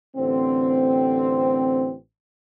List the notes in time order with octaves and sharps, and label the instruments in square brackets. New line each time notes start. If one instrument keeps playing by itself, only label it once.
[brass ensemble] A1 D3 C4